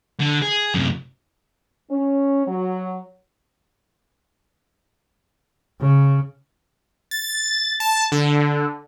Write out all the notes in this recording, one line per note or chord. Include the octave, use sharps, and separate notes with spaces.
D3
G#4
F#2 C3
C#4
F#3
C#3
A6
A5
D3